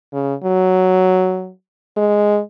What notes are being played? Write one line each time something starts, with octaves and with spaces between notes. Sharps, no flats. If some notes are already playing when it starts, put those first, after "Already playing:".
C#3
F#3
G#3